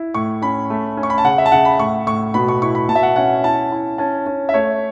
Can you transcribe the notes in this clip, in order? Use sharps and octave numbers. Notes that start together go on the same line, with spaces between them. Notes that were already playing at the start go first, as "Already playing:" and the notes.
Already playing: E4
A2 C#6
C#4 B5
A3
C#4
C#6
B5
A5
C#3 F#5
E5
A5
C#3 F#5
B5
A2 C#6
A2 C#6
B2 B5
C#6
E4 C#6
B5
B2 A5
E5
F#5
C#4 F#5
E4 A5
E4
C#4 A5
C#4
E5
A3 C#5